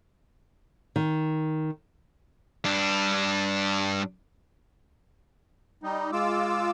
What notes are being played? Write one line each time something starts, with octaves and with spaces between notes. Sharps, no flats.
D#3
G2 D4
G3 D#4
G#3 F4 D6 E6